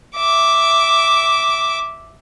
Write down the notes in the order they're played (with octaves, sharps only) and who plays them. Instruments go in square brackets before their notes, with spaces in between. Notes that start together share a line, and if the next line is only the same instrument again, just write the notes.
[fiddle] E5 D6